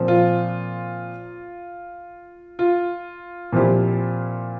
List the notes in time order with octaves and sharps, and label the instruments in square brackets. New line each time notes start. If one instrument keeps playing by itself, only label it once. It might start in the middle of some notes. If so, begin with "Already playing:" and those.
Already playing: [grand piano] A#2 F3 C4
[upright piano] F4
F4
[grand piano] A#2 F3 C4 E4 G4